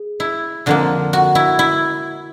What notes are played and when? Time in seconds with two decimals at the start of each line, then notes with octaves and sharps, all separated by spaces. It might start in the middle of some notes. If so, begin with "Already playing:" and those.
Already playing: G#4
0.20 E4
0.66 F2 D3 F3 A#3
1.13 F#4
1.35 E4
1.59 E4